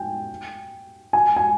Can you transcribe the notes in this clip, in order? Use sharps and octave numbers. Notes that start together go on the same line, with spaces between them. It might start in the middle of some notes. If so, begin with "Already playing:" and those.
Already playing: G5 G#5
G#5
G#5